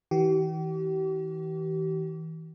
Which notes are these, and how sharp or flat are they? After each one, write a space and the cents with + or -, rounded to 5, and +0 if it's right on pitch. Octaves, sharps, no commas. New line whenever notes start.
E3 -40 G4 -40